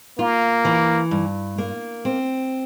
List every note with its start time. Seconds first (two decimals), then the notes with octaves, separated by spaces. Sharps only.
0.19 A#3 F4
0.65 E3
1.11 G2
1.58 A#3
2.05 C4